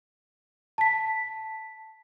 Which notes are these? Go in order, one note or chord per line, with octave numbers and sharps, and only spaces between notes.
A5 B6